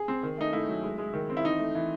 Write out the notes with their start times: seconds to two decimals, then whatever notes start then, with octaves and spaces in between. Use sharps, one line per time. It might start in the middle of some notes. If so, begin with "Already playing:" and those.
Already playing: G#4
0.08 C4
0.23 D#3
0.38 A3 D#4
0.53 A3 E4
0.68 F#3
0.83 G#3
0.98 G#3
1.14 D#3
1.30 C4
1.37 E4
1.45 E3 D#4
1.59 A3
1.75 E3